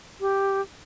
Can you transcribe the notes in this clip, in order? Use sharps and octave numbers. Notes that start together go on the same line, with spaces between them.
G4